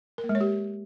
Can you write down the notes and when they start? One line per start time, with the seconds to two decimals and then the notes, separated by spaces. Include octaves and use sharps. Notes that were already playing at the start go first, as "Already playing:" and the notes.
0.18 A#4
0.24 A#3
0.29 G#3
0.35 C#5
0.41 G4